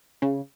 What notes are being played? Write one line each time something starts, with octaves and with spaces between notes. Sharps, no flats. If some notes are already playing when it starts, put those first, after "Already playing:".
C#3